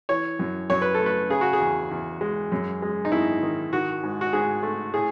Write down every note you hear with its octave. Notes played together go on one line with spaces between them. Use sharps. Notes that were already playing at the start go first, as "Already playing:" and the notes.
E3 C#5
F#2
F#2 C#5
B4
A4
A3
B4
C#3 G#4
F#4
G#4
E2
E2
G#3
F#2
G#3
D#4
G#1 E4
D#3
D#3 F#4
G#2
F#4
G#2 G#4
A3
A2 G#4